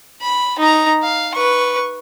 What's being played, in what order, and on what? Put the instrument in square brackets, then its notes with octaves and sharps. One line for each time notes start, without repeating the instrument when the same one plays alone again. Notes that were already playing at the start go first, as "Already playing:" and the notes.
[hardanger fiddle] B5
D#4 A#5
F5
B4 C#6